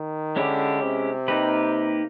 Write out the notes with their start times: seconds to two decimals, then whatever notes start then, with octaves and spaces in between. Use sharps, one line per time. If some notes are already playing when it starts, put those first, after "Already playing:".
Already playing: D#3
0.36 D3 G#3 C#4 E4 G4
0.82 C3
1.28 A#3 D#4 G4 B4